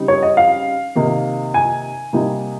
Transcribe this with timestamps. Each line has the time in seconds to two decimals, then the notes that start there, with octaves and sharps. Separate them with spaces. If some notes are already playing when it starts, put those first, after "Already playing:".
Already playing: C#3 G3 C4 D#4
0.08 C#5
0.23 D#5
0.37 F5
0.95 C3 D#3 A#3 D#4
1.54 G#5
2.13 C3 G3 A#3 D#4